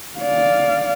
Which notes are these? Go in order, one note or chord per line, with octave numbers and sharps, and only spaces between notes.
D5 F5